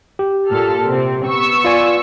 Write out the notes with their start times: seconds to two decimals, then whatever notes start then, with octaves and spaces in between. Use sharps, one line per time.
0.19 G4
0.50 A#2 A4 F6
0.86 C3 C4
1.27 B3 C#6 E6
1.65 F4 D5 G#5